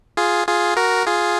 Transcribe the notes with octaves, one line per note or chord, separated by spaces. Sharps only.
F4 G#4
F4 G#4
F#4 A#4
F4 G#4